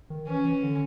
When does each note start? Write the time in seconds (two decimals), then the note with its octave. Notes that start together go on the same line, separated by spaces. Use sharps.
0.10 D#3
0.27 E3 C#4
0.45 E3
0.63 D3